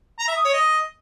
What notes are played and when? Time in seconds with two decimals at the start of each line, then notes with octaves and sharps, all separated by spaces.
0.19 A#5
0.28 E5
0.36 D#6
0.45 C#5
0.53 D#5